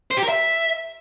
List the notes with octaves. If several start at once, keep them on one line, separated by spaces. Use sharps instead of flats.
C5
G4
A#4
E5